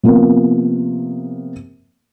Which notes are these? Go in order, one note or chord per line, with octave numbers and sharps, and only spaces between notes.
C3 F3 A#3 B3 A#4